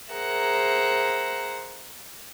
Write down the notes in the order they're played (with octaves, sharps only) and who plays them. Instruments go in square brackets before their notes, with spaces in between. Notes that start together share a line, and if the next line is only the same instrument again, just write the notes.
[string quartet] G#4 A#4 C5 E5 F#5 A#5